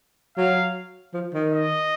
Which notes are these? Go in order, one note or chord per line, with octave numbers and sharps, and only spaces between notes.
F#3 F5
F3
D#3
D#5